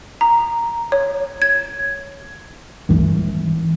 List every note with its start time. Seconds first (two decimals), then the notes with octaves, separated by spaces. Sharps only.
0.21 A#5
0.92 C#5
1.42 G#6
2.89 G#1 E3